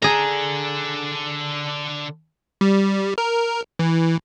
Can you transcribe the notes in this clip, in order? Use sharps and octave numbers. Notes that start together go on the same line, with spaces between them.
D3 D4 G#4 A#5
G3
A#4
E3